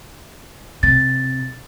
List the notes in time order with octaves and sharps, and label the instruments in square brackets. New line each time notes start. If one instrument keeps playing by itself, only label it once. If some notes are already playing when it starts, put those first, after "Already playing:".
[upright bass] C3 [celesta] A6